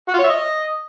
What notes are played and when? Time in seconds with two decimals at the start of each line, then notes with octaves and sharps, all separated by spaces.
0.08 F#4
0.13 F4
0.19 C#5
0.24 E5
0.29 D#5